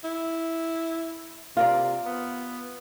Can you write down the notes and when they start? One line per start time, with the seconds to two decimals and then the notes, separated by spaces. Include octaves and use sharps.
0.04 E4
1.57 C3 F4 A#4 D5
2.06 B3